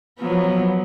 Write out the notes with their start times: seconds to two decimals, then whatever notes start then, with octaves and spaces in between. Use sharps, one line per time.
0.20 F3 F#3 B3